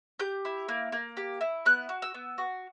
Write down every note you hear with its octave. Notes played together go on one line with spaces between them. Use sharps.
G4 G6
E4
A#3
A#3
G4
E4
B3 F#6
F#4
E6
B3
F#4